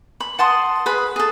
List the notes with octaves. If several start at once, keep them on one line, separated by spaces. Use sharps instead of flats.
B5
F#5 A5 C6 D#6
G#4 B4 B5
G#4 A4